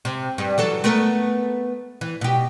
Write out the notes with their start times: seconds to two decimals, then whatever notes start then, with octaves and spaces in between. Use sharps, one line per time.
0.05 C3
0.38 G2
0.58 E3 F#3 A4
0.84 A3 B3 A#4
2.01 E3
2.21 B2 G4